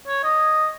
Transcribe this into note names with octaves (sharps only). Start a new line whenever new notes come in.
C#5
D#5